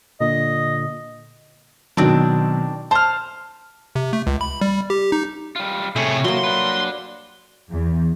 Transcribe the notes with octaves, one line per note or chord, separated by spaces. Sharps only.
A#2 D3 D#5
B2 D#3 F#3 C4 D4
C5 A5 F6
C3
A3
C#2
B5
G3
G4
D#4
G3 F4
C3 A3 E4 G#4 C#5
F#3 A#3 C6
D4 B4
E2